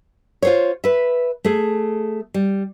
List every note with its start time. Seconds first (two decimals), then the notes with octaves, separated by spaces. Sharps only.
0.42 F4 C5 C#5
0.84 B4 E5
1.44 A3 G#4
2.34 G3